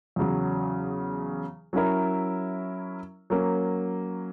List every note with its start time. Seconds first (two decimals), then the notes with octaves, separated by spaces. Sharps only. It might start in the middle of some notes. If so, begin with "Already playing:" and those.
0.16 E2 C#3 F#3
1.73 F#3 C#4 E4 A#4 E5
3.30 F#3 A#3 C#4